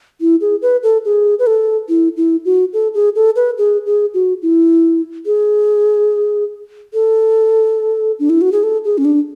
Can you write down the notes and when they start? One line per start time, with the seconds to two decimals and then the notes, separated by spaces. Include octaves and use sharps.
0.21 E4
0.41 G#4
0.62 B4
0.83 A4
1.05 G#4
1.39 B4
1.47 A4
1.89 E4
2.17 E4
2.45 F#4
2.73 A4
2.94 G#4
3.16 A4
3.36 B4
3.58 G#4
3.86 G#4
4.14 F#4
4.42 E4
5.26 G#4
6.94 A4
8.19 D4
8.30 E4
8.41 F#4
8.52 G#4
8.63 A4
8.85 G#4
8.98 C#4
9.05 D4